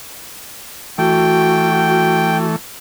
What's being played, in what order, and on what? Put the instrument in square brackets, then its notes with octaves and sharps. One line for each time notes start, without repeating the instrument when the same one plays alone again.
[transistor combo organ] E3 A3 [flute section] F#4 [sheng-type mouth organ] G5